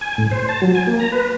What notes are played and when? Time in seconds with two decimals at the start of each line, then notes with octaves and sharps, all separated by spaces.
0.01 G#5
0.18 A2
0.31 C5
0.49 A5
0.61 F#3
0.75 G#5
0.87 A#3
1.00 A#5
1.12 B4